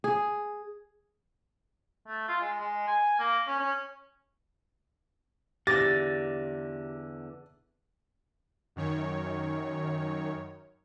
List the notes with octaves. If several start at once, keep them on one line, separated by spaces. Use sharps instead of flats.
G#4
A3
F4
G#3
G#3
G#5
A#3
C#4
C#4
E2 D3 G4 D6 A6 A#6
F#2 D#3 C#5